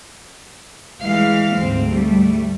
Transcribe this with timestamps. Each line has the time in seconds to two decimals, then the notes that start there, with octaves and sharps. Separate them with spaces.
1.02 E3 G#3 F5
1.55 D2 G#2 C4
1.87 G3 A3